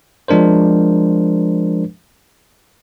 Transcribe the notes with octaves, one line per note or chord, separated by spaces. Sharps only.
F3 G#3 D4 A#4 C5